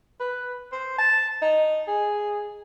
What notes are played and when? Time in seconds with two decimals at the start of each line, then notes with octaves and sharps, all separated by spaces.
0.20 B4
0.72 C5
0.98 A5
1.42 D#4
1.88 G#4